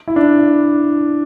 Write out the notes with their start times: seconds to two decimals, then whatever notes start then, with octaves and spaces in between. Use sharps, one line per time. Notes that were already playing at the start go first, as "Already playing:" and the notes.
0.08 E4
0.16 D4